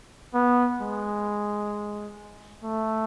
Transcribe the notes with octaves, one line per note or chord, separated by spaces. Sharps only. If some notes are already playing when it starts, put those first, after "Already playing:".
B3
G#3
A3